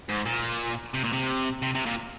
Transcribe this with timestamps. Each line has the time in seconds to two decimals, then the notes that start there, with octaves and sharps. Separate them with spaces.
0.09 G#2
0.25 A#2
0.94 C3
1.04 A#2
1.13 C3
1.62 C3
1.75 C3
1.86 A#2